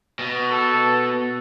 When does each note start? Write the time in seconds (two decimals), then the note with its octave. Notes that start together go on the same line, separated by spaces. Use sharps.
0.19 B2
0.50 A4